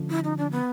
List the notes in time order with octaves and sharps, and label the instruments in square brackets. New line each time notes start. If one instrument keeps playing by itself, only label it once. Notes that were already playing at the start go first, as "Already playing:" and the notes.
Already playing: [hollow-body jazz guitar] D3 F3 A3 C#4
[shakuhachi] E4
D#4
D4
B3